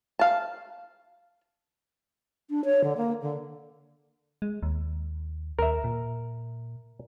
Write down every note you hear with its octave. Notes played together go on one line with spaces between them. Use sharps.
F5 A5
D4
C#5
D3
A#3
D3
G#3
D#2
D#2 A#4 E5
A#2